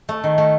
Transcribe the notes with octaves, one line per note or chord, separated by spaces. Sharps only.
A3
D#3
A3